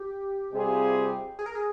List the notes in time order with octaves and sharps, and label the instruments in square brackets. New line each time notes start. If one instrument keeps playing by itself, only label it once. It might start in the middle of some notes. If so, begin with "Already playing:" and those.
Already playing: [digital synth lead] G4
[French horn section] C3 G3 C4 F4 G#4
[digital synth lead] G#4
A#4
G#4